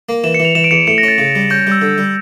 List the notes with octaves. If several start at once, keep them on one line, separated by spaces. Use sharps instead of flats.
A#3
E3 E7
C#7
E3
F7
E3 E7
D7
E2 C#7
A2 C#7
A#6
C#4 A6
C#3
G3
C#4 G6
G3 E6
D3
G3